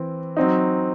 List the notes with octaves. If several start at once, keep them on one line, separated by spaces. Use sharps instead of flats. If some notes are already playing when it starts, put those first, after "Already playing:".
Already playing: E3 C4
F#3 C4 D#4